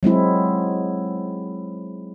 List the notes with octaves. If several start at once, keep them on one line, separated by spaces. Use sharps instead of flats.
F#3 G#3 C4 E4